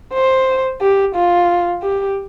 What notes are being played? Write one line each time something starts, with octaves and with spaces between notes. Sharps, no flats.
C5
G4
F4
G4